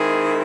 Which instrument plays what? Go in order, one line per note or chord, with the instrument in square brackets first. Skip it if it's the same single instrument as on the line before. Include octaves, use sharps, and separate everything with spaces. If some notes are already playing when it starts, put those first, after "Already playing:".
Already playing: [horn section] D#3 G#3 C4 E4 G#4